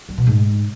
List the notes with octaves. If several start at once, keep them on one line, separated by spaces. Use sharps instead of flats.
G3
B2
G#2